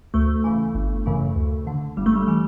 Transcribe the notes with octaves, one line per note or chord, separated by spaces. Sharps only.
D2 A3
C#3 E3
G1
F#2 C#3 E3
D2
D3
G1 G3
A3
G3
E3 G3